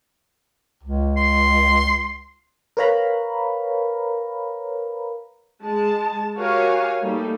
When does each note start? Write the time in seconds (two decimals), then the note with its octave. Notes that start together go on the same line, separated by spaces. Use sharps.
0.83 C#2
1.17 C6
2.77 A#4 B4 C#5 F5 A#5 B5
5.61 G#3 A5
6.38 F#4 G4 A#4 C#5 F5 G#5
7.03 G3 A3 A#3 D#4 G4